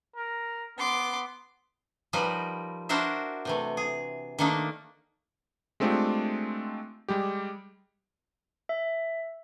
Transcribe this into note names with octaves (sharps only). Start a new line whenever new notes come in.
A#4
B3 C6 D6
F3 G3 D#4 A#4 B4
D4 E4 F#4 A#4 C5 E5
C3 E3 A3
G#4
D#3 A3 A#3 D4 D#4
G#3 A3 C4 D4 F4 G4
G3 G#3 G4
E5